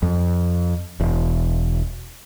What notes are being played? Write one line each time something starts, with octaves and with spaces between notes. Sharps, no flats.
F2
E1